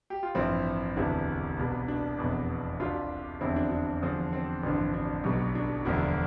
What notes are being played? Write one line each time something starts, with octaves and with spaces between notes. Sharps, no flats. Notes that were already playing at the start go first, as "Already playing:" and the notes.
G4
F4
A1 G2 F3 C4 E4
E1 D2 C3 E3 G3 D4
C2 B2 G3
D4
F1 E2 B2
C2 C3 G3 D4 F4
F1 E2 D3 C4 E4
D4
D4
E2 D3 F3
C4
A1 G2 D3 F3
D4
B1 B2 G3
D4
E1 D2 D3 F3 D4